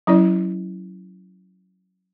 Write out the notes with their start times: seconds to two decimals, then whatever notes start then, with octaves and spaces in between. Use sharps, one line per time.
0.07 F#3 C#4 E4 D5